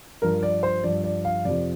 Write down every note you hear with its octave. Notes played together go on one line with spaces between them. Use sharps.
G2 F3 A#4
D5
C5
G2 F3 D5
D5
F5
F2 C3 F3 D5